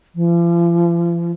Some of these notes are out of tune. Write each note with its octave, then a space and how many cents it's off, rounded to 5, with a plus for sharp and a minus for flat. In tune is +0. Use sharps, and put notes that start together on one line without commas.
F3 -40